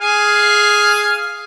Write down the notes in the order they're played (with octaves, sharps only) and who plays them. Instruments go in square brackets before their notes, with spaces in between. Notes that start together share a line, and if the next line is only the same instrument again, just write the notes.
[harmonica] G#4 F5 G#5